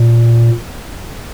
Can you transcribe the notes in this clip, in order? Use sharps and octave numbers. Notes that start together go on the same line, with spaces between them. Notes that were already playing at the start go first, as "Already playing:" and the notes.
Already playing: A#2